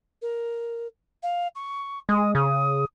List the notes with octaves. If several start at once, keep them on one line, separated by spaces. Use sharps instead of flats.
A#4
F5
C#6
G#3 D#6
C#3 D#6